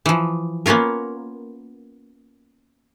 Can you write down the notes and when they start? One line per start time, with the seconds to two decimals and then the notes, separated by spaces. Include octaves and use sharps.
0.06 E3 F3
0.66 A#3 B3 C#4 F4 A#4